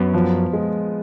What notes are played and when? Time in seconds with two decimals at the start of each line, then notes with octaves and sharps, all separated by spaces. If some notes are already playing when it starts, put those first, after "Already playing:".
Already playing: F#2 F#3 B3
0.14 F3
0.53 G#3